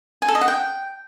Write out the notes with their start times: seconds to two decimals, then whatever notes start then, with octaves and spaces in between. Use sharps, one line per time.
0.22 G#5
0.28 A4
0.35 D#5
0.41 F#5
0.48 G5